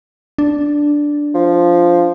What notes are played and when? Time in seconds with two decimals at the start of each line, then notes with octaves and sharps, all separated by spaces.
0.38 D4
1.35 F3